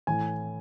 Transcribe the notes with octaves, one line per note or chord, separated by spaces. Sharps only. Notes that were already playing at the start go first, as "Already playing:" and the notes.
A2 E3 G#5